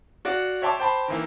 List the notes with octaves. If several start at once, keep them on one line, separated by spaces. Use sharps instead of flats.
F#4 D5 F5 F#5
C#5 E5 G5 A5 C6 D6
C5 G5 A5 B5 C6
D#3 E3 A#3